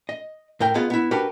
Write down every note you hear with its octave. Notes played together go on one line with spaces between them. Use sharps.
D#5
A2 A#4 G5
B3 F4 G#4 D#5
B3 E4
D4 F#4 G4 A#4 B4